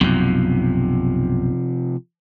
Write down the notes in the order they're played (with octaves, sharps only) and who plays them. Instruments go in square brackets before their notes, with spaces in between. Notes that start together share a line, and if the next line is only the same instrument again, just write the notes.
[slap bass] B1 F#2 [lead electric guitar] C3 F3